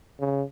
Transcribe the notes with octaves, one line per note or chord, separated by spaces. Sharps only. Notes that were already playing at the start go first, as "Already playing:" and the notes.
C#3